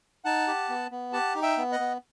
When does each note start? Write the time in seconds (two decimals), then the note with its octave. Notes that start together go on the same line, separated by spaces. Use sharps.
0.25 D#4 F#5 A5
0.48 G4
0.69 B3
0.91 B3
1.13 G4 F#5 A5
1.35 D#4
1.42 E5 G5
1.57 B3
1.72 D#5 F#5
1.80 B3